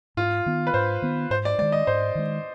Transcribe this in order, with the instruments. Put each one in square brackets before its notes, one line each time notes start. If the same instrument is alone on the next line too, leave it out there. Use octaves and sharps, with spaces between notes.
[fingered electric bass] G#2 [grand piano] F4
[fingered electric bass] D#3 B3
[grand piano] B4
[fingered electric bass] G#2 [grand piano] C5
[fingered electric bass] D#3 B3
[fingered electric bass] G#2 [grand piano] C5
[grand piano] D5
[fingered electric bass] G#3 [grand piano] D5
[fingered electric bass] D#3
[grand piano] D#5
[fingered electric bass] G#2 [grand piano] C5
[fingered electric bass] D#3 G#3